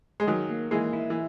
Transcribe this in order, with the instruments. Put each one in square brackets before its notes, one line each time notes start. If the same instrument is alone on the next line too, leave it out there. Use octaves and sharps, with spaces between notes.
[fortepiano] G#3
[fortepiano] D#3 F#3 [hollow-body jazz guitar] G#4
[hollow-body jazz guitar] A#3
[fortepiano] E3 G#3 [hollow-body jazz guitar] A#3
[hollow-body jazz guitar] E4
[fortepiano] E3